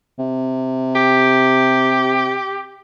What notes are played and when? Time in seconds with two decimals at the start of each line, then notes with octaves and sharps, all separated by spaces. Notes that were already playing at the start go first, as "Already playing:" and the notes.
0.19 C3
0.95 G4